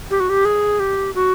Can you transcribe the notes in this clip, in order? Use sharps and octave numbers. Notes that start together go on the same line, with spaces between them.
G4
F#4
G4
G#4
G4
F#4